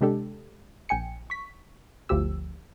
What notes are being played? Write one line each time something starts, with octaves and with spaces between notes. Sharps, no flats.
C3 G#3 D4 G4 A4
A#1 G5 G#5 C#7
C#6 B6
G1 D2 F3 G4 E6